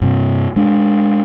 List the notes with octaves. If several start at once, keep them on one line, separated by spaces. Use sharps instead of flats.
G2 C3
G#3 D4